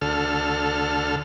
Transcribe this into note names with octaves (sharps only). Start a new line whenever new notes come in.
D2 A4 F6